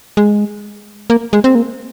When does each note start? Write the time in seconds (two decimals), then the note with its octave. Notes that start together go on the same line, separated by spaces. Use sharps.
0.17 G#3
1.10 A#3
1.33 G#3
1.44 C4
1.55 A#3